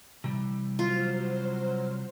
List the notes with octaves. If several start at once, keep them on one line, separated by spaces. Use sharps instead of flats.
C3 E3 G3
F#3 F4 C5 F6